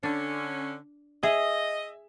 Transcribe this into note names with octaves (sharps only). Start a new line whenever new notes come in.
D3 C#4 D4
G#4 D#5 E5